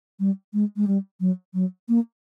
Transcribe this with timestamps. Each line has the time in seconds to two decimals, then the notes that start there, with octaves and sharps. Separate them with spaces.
0.19 G3
0.53 G#3
0.76 G#3
0.87 G3
1.20 F#3
1.54 F#3
1.89 A#3